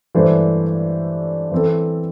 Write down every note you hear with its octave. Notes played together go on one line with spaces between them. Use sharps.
G2 E3 A3 D4 C5
E3 C4 A4